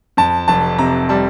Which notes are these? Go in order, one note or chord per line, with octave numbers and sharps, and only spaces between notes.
F2 A5
F1 A5
C3 A#5
G3 A5